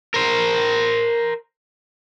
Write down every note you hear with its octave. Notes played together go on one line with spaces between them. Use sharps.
A#4 C5